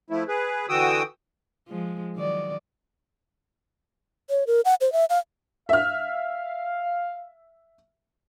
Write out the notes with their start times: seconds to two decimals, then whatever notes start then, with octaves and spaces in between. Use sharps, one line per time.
0.10 F3 A3 E4
0.28 G#4 B4
0.69 D3 E3 F#4 G5 D#6 E6
1.68 F3 G#3
2.16 D#3 F#3 D5
4.30 C#5
4.47 A#4
4.65 F#5
4.81 C5
4.93 E5
5.10 F5
5.69 E5 F5 F6